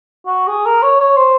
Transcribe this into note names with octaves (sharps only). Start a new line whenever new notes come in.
F#4
G#4
A#4
C#5
C#5
C5